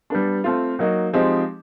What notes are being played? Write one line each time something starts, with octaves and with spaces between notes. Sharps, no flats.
G3 B3 D4
A3 C4 F4
F#3 A#3 D#4 F#4
F3 G#3 C4 D#4 G4